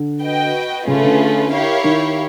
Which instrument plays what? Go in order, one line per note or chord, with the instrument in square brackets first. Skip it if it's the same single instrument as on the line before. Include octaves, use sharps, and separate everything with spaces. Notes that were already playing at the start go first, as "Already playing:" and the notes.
Already playing: [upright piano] D3
[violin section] F#4 B4 D#5 G5
[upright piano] C#3 [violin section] A3 C#4 F4 G#4 B4
[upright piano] D3
[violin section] E4 G4 A#4 C#5 F5
[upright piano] D#3